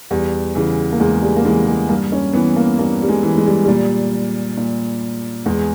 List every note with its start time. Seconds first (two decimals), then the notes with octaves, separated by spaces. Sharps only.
0.11 E2 G3
0.55 C#3 E3
0.92 A#3
1.00 E2 G#3
1.22 G3
1.36 A#3
1.45 C#3 E3 G#3
1.67 G#3
1.89 G2 A#3
2.12 C#4
2.33 E3 B3
2.56 A#3
2.79 G2 A#3
3.02 G3
3.09 G#3
3.23 E3
3.37 G#3
3.46 G3
3.65 A#2 G3
4.57 A#2
5.46 E2 G#3